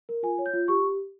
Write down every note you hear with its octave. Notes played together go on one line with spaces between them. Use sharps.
A#4
F4 G#5
C#5
G6
F4
G4 C#6